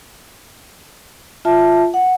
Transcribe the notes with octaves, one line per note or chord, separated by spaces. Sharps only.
F4 E5 A5
F#5